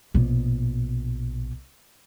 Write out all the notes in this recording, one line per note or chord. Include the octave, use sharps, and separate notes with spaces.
A#1 B2